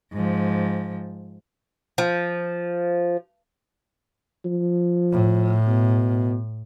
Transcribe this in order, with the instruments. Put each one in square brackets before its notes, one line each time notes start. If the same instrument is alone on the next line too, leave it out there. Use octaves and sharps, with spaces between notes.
[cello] G#2 F3
[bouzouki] F3
[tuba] F3
[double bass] A2
[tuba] B2